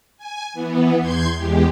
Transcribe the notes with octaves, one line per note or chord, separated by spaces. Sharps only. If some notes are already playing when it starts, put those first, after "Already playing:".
G#5
E3 B3
E2 C6 G6 G#6
E2 G#3 G4